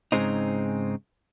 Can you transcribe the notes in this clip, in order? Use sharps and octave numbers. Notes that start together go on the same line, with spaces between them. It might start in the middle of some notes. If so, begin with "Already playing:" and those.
G#2 C#3 E3 G#3 C4 D#4